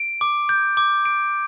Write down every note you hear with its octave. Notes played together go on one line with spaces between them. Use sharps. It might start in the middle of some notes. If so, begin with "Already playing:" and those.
Already playing: D7
D6
G6
D6
D7